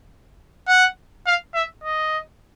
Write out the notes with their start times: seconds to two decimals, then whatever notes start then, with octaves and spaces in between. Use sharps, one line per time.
0.68 F#5
1.26 F5
1.54 E5
1.84 D#5